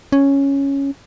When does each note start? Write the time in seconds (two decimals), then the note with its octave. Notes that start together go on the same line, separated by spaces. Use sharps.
0.12 C#4